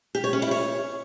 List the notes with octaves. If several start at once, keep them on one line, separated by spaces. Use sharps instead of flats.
G4
C#5
C#4
E4
C#5